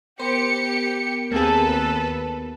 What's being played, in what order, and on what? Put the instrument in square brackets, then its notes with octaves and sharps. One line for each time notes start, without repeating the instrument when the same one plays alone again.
[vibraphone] B3 A#4 [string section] G4 C#7 [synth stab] C5
[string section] D#2 A4 B4 [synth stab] A#3 C4 G#4